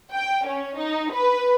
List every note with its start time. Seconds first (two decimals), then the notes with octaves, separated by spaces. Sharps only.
0.14 G5
0.47 C#4
0.79 D#4
1.13 B4